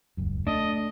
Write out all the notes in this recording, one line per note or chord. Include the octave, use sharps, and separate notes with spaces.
D#1 C#2 F#2
A3 D4 D#5